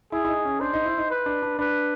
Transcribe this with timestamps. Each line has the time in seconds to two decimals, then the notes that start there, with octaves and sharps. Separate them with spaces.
0.12 E4 G#4
0.25 E4
0.28 D#4
0.45 C#4
0.60 D4 C5
0.73 D#4
0.86 E4
0.98 D#4
1.10 B4
1.26 D4
1.42 D4
1.59 D4 B4